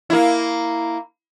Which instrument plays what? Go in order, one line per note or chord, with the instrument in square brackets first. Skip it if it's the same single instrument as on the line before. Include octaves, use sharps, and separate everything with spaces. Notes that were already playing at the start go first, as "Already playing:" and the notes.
[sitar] A#3 E4